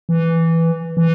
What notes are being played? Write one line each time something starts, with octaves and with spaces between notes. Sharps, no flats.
E3
E3